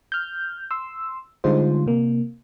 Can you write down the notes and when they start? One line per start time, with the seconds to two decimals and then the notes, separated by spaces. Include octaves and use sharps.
0.12 F6 G6
0.71 C6 E6
1.44 D3 G3 G#3 D#4 F4 C5
1.86 C3 A#3